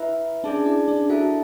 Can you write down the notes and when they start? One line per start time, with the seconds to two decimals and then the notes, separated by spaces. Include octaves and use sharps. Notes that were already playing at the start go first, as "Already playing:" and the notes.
Already playing: E4 B4 E5
0.44 C#4 D4 G#4 D5 A5
0.66 E4
0.88 D4
1.10 E4 F#4 A4 E5 A5